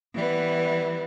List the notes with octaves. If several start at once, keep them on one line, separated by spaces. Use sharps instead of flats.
E3 G3 B3